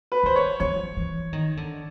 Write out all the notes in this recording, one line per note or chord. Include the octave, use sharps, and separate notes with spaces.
B4
D#3 C5
C#5
F3 C#5
E3
D#3
D3